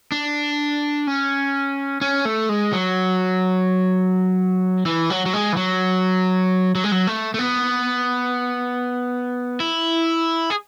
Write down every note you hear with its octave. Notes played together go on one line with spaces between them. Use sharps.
D4
C#4
C#4
A3
G#3
F#3
E3
F#3
F#3
G#3
E3
F#3
F#3
G#3
F#3
A3
A3
B3
E4
G#4